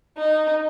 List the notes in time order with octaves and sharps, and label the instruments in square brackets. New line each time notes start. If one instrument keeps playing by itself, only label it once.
[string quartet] D#4